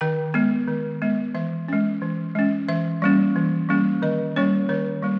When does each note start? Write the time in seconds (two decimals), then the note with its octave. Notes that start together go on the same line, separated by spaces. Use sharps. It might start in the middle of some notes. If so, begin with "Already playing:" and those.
0.01 D#3 G5
0.34 G#3 B3
0.68 D#3
1.02 G#3 B3
1.35 E3 E5
1.68 G#3 C#4
2.02 E3
2.35 G#3 C#4
2.69 E3 E5
3.02 G3 A#3 C#4
3.36 E3
3.69 G3 A#3 C#4
4.02 D#3 D#5
4.36 G3 A#3 C#4 C#5
4.69 D#3 C#5
5.03 G3 A#3